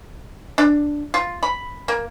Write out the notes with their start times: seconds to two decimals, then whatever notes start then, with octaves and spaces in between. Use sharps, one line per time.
0.58 D4
1.14 F4
1.43 B5
1.88 A#3